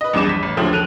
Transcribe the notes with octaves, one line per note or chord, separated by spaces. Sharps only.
B4 D#5
A#1 E2 G2 D6 E7
B6
A1
D#2 D3 F3 F#3 A3
A4 F#6 D7 D#7 F7